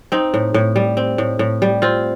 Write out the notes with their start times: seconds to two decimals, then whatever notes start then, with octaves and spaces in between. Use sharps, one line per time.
0.12 C4 D#4
0.34 A2
0.54 A2
0.76 G3
0.97 C4
1.18 A2
1.39 A2
1.62 G3
1.82 C4 F4